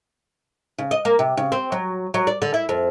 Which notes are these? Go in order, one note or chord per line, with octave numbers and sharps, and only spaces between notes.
C#3
D#5
A#3
C3
C#3
C4
F#3
F#3
D5
D3
E4
F2